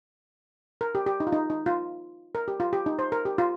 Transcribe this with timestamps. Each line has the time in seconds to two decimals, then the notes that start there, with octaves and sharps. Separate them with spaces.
0.81 A#4
0.95 G4
1.06 G4
1.20 D#4
1.27 F4
1.32 D#4
1.50 D#4
1.66 F4
2.35 A#4
2.48 G4
2.60 F4
2.73 G4
2.86 D#4
2.99 C5
3.12 A#4
3.25 G4
3.38 F4